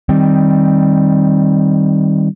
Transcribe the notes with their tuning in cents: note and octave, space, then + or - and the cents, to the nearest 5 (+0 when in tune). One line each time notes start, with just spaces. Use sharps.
D#3 +0 G3 +0 C4 +15